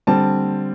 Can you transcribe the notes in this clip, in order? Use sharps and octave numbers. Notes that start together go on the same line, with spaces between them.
D3 G3 C4 A5